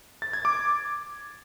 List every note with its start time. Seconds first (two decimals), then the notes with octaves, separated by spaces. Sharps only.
0.22 A6
0.33 G#6
0.45 D6